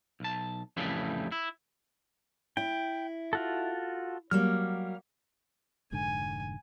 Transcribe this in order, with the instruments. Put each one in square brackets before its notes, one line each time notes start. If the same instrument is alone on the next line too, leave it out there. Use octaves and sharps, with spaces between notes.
[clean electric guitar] B1 A5
F2 A2 C#3 E3 G3 A3
E4
[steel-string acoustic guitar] E4 [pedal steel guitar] G5
[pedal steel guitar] F4 F#4 A4
[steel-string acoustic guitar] F#3 G3 A#3 [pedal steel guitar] F6
[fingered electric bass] F1 G#2 D3 [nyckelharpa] G#5